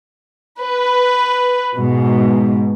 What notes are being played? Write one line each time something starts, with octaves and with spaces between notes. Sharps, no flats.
B4
G#2 B2